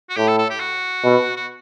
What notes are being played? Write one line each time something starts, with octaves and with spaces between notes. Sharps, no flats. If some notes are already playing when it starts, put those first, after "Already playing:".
F#4
A2 G4
A4
A4
G4
F#4
B2
F#4